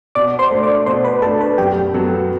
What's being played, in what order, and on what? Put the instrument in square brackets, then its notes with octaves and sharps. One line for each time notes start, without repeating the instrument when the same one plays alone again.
[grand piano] B2 [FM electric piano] D5 D6
[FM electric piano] C5 C6
[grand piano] A3 D4
[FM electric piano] D5 D6
[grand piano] B2 [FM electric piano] C5 C6
[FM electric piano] B4 B5
[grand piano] A3 [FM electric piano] A4 A5
[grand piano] D4
[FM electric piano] B4 B5
[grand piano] F#2 [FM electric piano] G4 G5
[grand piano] F#3 B3 F#4 A4